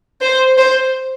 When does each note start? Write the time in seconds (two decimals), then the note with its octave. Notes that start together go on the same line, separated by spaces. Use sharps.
0.21 C5
0.58 C5